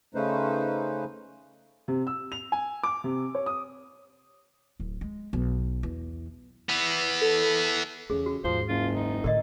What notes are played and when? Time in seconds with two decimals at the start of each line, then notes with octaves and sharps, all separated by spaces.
0.15 C#3 A3 C#4 D#4 B4 C5
1.88 C3
2.07 E6
2.32 F7
2.52 G#5
2.83 D6
3.04 C3
3.35 C#5
3.46 D#6
4.80 D1
5.01 G#3
5.33 B1
5.83 E2
6.69 E3 B3
7.21 A4
8.10 E2 C#3 D4 G#4
8.26 F#4
8.44 D#2 G#2 F3 C5
8.69 F#1 F4
8.95 D#4
9.24 A2 D3 A#4 D5 D#5